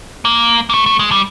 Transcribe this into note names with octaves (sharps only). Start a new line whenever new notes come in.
A#3
A#3
A3
A3
G#3
G3